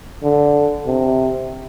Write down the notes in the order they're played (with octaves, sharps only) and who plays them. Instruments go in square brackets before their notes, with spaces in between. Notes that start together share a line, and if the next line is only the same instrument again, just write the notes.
[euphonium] D3
C3